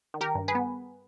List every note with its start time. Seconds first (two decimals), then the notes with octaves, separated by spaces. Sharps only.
0.14 D#3
0.21 G4 A#4
0.35 G2
0.48 G#4 B4
0.55 B3